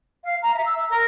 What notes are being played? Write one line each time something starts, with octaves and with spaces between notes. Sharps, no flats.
F5
A#5
E5
E6
A#4